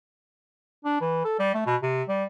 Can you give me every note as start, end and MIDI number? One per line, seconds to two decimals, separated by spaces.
0.85 0.97 62
1.01 1.21 52
1.25 1.37 69
1.39 1.53 55
1.54 1.65 57
1.66 1.76 47
1.82 2.03 48
2.08 2.25 55